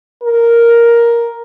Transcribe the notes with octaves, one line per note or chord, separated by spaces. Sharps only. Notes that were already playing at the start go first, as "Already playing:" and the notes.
A#4